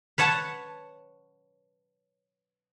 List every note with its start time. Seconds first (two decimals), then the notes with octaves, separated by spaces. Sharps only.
0.18 B4 C#5 F#5 A5